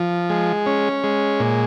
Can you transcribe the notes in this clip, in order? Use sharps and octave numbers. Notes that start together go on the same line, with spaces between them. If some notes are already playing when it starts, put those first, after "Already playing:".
Already playing: F3
G#3
C#4
G#3
A#2